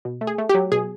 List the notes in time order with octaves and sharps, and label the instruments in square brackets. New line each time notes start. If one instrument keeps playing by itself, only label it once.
[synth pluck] B2
A3
G#4
A3
F#3 G4
B2 G#4